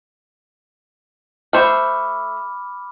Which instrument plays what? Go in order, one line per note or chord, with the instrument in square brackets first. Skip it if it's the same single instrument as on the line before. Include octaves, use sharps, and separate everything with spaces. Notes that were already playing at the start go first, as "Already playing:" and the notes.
[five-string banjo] A3 C5 [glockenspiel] B5 D6 F6